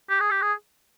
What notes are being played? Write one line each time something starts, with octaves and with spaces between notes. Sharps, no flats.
G4
G#4
G4
G#4